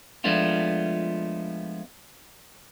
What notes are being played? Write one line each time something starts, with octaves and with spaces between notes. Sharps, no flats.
F3 G#3 A3 B3 D4 F4